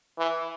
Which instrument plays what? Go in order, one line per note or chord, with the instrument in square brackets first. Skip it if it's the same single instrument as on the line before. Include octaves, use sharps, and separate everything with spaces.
[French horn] E3